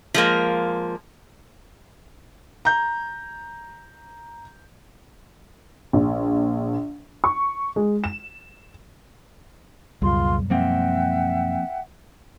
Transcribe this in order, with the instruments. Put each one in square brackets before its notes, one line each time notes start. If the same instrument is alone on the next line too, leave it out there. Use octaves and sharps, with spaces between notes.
[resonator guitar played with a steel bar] F3 G#3 A#3
[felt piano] A#5 G6
[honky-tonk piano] A#1
C#6
G#3
E7
[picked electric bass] C#2 [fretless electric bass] F#2 B2 G3 [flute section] F4 C6
[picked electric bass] F3 A#3 C4 [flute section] E5 F#5 G5